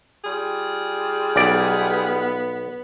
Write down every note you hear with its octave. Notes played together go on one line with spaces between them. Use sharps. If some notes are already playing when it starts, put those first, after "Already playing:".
G3 F4 G#4
B1 B3 D5